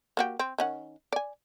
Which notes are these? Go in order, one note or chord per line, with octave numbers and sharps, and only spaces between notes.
A#3 F#4 G4
C4
D#3 C#4 F#5
D5 G#5